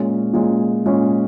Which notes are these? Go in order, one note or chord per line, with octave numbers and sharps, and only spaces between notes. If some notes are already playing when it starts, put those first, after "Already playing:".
Already playing: A#2 G#3 C#4
A#2 G#3 C#4
A#2 G#3 C#4